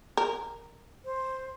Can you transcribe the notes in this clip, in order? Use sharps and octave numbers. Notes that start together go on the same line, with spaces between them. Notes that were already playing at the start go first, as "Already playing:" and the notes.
A#4
C5